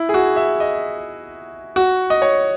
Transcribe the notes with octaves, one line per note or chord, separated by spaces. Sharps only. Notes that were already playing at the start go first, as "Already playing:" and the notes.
Already playing: E4
G#4
F#4
E5
D#5
F#4
D#5
C#5